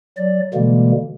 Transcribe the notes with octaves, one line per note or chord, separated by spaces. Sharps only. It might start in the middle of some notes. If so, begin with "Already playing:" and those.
F#3 D5
B2 D3 E3 G3 G#3 A#3